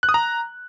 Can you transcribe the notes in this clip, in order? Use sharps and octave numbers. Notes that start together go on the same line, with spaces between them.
F#6
D#6
A#5